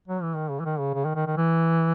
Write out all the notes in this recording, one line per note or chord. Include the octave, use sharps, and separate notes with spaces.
F#3
E3
D#3
C#3
E3
D#3
C#3
C#3
D#3
D#3
D#3
E3